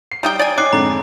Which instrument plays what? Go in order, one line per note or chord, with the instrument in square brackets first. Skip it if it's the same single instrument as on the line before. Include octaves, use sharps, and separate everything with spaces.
[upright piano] C7
[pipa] G3 D#4 G5 [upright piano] A#5
[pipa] D5 G5 G#5
[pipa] C#4 [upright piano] D#4 F#6 [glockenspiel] D6 C7
[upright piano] F2 G#2 D3 [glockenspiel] A#5